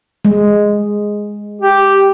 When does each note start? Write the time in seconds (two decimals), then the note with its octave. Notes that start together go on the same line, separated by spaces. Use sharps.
0.25 G#3
1.61 G4